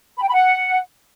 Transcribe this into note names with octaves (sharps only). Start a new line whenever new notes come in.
B5
G5
B5
F#5